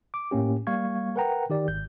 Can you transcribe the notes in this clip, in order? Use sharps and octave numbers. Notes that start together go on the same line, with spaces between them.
D6
A2 A#3 C#4 G4
G3 A#3 F5 C#6 G#6
A#4 B4 F#5 G5 A#5
D#3 G4 D5
G#1 G6